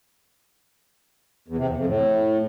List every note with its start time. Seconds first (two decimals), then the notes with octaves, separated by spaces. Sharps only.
1.48 E2
1.58 C3
1.67 E2
1.77 F2
1.86 A2